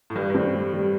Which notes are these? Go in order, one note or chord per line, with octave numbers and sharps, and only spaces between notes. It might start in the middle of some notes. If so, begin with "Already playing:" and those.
A2
G2 G3
G2
A2 C4
G3
G3